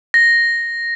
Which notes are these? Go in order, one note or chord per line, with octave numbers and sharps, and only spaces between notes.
A#6